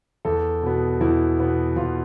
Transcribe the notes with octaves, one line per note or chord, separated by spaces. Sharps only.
E2 A4
B2 B3
E2 E4
B2 B3
E2 F4